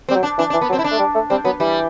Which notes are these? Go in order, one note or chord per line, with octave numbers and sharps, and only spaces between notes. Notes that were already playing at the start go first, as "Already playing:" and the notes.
G3 C4
F#3
D4
E3 D4
D4
E3
B3
F#3
C4
E4
D4
A3
G3
A3
G3 C4
F#3 B3
E3 G3